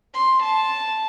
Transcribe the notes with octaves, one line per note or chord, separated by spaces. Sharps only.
C6
A5